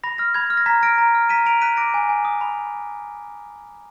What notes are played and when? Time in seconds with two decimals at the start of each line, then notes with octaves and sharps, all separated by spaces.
0.04 B5 A#6
0.18 F6 A#6
0.34 B5 G#6
0.50 F6
0.57 A#6
0.66 A#5 G#6 B6
0.83 F6 A#6 D7
0.98 A#5
1.15 F6
1.29 A#5 B6 D#7
1.46 A#5 D7 F7
1.61 F#6 B6 D#7
1.77 D6 A#6 D7
1.94 G#5
2.09 G#5
2.25 D#6
2.41 B5